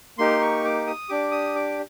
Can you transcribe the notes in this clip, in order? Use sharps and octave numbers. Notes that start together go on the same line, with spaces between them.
A#3 D#4 G4 C6
C#6
D6
D#6
D4 G4 D6
D#6
D6